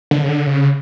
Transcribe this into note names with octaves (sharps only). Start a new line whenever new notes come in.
D3
C#3
D3
C#3